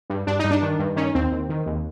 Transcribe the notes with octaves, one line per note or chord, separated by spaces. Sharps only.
G2
G2 D4
G2 D#4
D4
D#3
G2
D#3 C#4
D#2 C4
D#2
D#3
D#2